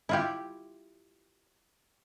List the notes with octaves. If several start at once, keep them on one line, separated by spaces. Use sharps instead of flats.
E4 F4 G4